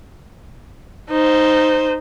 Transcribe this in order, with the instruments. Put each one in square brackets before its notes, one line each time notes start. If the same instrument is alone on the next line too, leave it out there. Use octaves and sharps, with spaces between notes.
[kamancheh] D#4 C5